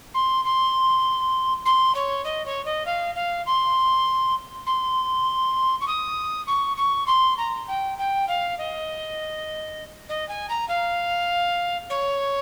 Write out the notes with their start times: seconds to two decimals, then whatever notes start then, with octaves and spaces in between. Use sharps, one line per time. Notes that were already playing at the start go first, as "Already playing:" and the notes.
0.14 C6
0.45 C6
1.65 C6
1.95 C#5
2.24 D#5
2.45 C#5
2.65 D#5
2.85 F5
3.15 F5
3.46 C6
4.66 C6
5.81 C#6
5.87 D#6
6.47 C#6
6.77 C#6
7.07 C6
7.37 A#5
7.67 G5
7.98 G5
8.28 F5
8.58 D#5
10.09 D#5
10.28 G#5
10.49 A#5
10.68 F5
11.90 C#5